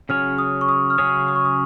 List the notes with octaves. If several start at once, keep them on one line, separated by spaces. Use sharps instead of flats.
C#3 F#3 C#4 G#4 C#5 F6
D#6
C#6
D#6
F6
C#3 F#3 C#4 G#4 C#5 D#6
D#6
C#6
D#6